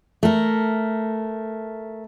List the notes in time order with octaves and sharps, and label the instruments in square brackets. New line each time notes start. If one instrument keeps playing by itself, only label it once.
[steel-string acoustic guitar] A3 A#4